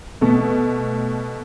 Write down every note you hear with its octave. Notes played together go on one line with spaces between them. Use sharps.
B2 A3